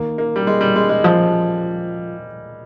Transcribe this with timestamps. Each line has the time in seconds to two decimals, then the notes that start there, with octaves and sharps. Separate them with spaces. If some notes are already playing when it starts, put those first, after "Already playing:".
Already playing: D#3 A#3
0.18 A#3
0.36 G3
0.47 G#3
0.61 G3
0.76 G#3
0.89 G#3
1.04 F3